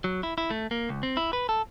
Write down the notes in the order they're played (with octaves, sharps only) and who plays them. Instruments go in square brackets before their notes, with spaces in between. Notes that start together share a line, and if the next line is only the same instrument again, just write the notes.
[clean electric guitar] F#3
E4
E4
A3
A#3
C#2
C4
E4
B4
A4